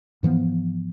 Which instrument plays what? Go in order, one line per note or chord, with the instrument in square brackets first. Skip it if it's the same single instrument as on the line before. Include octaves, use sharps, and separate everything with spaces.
[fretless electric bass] G#2 E3 F3 B3